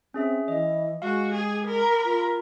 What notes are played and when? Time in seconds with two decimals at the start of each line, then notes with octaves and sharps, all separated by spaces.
0.14 C4 C#4 G#4 E5
0.48 E3 D#5
1.02 G#3 F#4 F5
1.34 G4 G#4
1.66 A#4 B5
2.05 F4